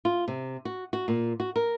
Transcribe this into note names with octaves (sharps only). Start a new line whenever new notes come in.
F4
C3
F#4
F#4
A#2
F#4
A#4